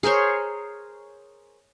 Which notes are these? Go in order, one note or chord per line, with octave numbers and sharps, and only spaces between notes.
G#4 A#4 C5 C#5